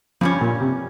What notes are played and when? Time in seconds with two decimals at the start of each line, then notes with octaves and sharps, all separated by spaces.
0.21 G2 F3 G3 C#4
0.41 A#2
0.61 C3